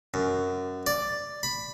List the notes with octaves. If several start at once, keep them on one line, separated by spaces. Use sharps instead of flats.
F#2
D5
B5